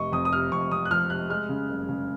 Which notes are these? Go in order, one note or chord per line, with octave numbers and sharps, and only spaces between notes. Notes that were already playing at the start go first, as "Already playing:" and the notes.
Already playing: F1 C3 D#5 C#6
F2 D#6
D#6
C3 F6
F2 C#6
F2 D#6
F#6
F3 F6
C3 F#6
G#3 F6
C#3
F#1
C#3